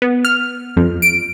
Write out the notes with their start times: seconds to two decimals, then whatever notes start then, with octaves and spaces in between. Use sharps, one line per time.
0.02 B3
0.25 F6
0.77 F2
1.02 D7